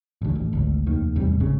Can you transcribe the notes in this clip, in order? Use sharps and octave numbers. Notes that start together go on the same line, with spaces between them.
A1 D2
A1
G#1 D2
F1 D#2 D#3
A1 E2 C3 G3
G#1 C#3